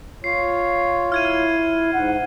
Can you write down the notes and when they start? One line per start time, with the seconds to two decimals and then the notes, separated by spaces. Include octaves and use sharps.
0.24 F4 C#5 C7
1.12 E4 F6 G#6 D#7
1.93 G#2 F#5